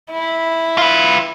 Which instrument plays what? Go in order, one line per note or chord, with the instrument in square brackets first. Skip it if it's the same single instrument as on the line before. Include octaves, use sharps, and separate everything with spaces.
[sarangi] E4
[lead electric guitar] F4 B4